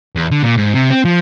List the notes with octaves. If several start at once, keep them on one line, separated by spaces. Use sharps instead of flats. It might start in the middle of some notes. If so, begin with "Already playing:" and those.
E2
D3
A#2
G#2
C3
C4
F3